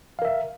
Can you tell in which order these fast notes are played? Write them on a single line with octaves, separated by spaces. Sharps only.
F5 A#4 E5